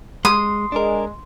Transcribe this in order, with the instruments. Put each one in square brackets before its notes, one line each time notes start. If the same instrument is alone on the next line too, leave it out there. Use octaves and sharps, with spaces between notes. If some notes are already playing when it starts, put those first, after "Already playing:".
[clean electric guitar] G#3 [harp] C6 [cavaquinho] D#6
[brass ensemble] G#3 [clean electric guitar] D4 A#4